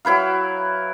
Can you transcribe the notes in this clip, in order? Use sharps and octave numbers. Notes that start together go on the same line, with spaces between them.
F#3 E4 B4 F5